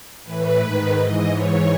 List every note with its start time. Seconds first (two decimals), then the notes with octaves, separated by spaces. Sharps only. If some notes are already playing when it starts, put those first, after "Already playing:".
0.23 A2 E3 B4
0.59 G#2 D#3
0.94 G#2 E3 D#5
1.30 G#2 E3 C#5